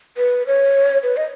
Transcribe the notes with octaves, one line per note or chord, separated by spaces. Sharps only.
B4
C#5
B4
D#5